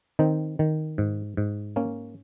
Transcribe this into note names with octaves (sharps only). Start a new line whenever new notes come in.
D#3 C4 D#4
D#3
G#2
G#2
A#3 C#4